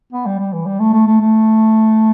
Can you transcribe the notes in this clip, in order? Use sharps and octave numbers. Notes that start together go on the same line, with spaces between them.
B3
G3
G3
E3
G3
A3
A3
A3
A3